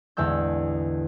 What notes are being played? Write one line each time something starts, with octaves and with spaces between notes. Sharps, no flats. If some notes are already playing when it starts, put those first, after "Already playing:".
A1 E2 D3 G#3 E6 G6